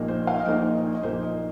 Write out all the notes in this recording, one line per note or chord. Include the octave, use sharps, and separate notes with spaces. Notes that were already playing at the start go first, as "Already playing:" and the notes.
Already playing: A#1 A#2 A#3 D#4
C5
F5
D#5
A#1 A#2 A#3 D#4 C5
D#5
D#5
A#1 A#2 A#3 D#4 C5
D#5